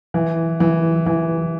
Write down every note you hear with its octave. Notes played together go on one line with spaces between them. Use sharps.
E3
E3
E3